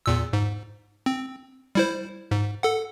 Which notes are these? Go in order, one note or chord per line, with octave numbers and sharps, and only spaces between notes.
E2 A#2 E6
G#2
C4
G3 E4 C5
G#2
A4 F#5